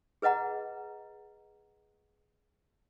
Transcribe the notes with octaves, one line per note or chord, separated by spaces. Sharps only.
G#4 B4 D#5 F#5 A#5